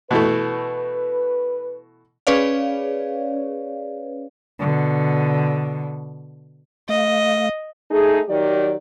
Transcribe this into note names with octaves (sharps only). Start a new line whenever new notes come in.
B2 E3 A3 B4
C#4 G#4 B4 C#5 D5 F5
B2 D3
A3 D#5 F5
A3 D#4 G#4
D#3 F#3 G4 D5